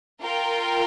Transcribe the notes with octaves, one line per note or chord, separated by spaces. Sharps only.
F4 A#4 G5